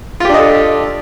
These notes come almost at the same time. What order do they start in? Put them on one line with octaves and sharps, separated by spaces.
F4 G4 D4 D#5 A4